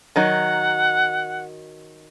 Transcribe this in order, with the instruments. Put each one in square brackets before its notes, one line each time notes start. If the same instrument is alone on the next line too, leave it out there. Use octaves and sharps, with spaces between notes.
[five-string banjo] D#3 F#3 D#4 [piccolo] F#5